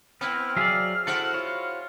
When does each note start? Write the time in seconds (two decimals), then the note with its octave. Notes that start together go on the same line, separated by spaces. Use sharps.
0.21 B3 C4 E4 F6
0.56 F#3 G#4 D5 E5 F5
1.07 E4 F#4 A4 C5 F#5
1.34 F4 C#5